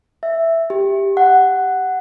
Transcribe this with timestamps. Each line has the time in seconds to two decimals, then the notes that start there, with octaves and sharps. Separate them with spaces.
0.23 E5
0.70 G4
1.17 F#5